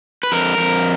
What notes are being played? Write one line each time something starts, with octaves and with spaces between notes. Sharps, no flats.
B4
F2 A#4
F2